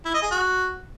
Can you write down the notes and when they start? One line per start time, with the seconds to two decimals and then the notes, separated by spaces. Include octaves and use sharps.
0.05 E4
0.14 D#5
0.22 G#4
0.31 F#4